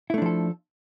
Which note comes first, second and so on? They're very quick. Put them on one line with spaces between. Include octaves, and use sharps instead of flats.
E4 A3 D4 F3 A4